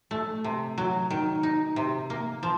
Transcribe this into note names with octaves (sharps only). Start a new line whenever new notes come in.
A3
C3
F#3
D#3
D#4
C3
A#3
F3